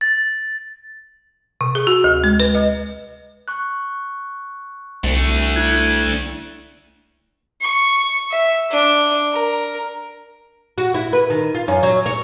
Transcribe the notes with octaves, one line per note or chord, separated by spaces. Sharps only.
A6
C3
G#4
F#4
D2
G#3
B4
D#5
C#6 F#6
C2 A3 D4
E4 F#6 G#6
C#6
E5
D4
A#4
F#4
E4
B4
D#3
F4
F#2
F#3
C#5